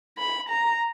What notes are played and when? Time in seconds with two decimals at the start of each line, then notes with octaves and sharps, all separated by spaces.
0.18 B5
0.49 A#5